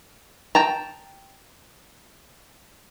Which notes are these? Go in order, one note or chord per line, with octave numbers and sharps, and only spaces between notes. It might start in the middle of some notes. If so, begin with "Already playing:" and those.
G5 A5 A#5